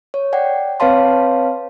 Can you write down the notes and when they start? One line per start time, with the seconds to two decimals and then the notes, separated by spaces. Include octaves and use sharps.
0.14 C#5
0.33 D5 F#5 G5
0.80 C4 B4 C#5 F5 A5 C6